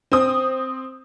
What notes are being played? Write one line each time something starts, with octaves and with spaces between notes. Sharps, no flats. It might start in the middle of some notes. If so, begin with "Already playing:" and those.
C4 D#6